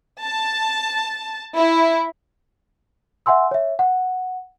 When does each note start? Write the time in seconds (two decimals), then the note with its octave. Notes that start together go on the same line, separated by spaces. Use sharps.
0.23 A5
1.56 E4
3.26 E5 F#5 G#5 C6 E6
3.51 C#5 E5
3.79 F#5